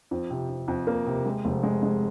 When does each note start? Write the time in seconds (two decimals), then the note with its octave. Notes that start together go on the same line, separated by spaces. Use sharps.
0.11 F2
0.30 C3
0.50 C3
0.68 F2
0.87 A#3
1.06 C3
1.26 G#3
1.45 F1
1.63 G#3
1.83 G#3